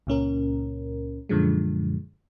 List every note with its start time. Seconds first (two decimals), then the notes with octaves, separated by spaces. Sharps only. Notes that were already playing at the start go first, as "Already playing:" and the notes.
0.07 C#2 A#2 C#4 A#4
1.29 F#2 A#2 D3 F3 G#3